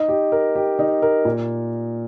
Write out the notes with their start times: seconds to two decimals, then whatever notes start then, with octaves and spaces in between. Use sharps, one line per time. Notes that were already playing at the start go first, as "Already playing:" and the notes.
Already playing: D#4
0.09 G4
0.32 A#4
0.55 G4
0.79 D#4
1.02 A#4
1.25 A#2